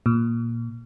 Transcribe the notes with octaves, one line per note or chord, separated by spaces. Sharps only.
A#2